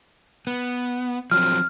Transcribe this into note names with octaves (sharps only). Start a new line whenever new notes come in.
B3
F3 F#3 C4 F6